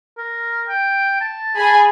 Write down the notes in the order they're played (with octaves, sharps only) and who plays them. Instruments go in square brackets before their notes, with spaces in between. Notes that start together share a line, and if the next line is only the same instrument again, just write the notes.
[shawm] A#4
G5
A5
[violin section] G#4 G#5 B5